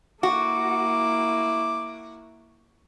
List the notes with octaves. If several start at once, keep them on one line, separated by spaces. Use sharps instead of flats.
A#3 E4 F#4 D6